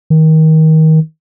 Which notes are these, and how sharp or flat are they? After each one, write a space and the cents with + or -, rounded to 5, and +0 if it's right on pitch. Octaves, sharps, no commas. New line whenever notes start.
D#3 +25